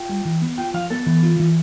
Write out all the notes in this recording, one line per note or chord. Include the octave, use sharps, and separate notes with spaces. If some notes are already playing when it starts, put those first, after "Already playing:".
Already playing: F4 G5
G3
E3
B3
F4 G5
F3 F5
B3 A4
E3
F4
E3